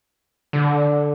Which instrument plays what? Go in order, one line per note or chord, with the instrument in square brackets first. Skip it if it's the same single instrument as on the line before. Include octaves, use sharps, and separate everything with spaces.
[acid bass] D3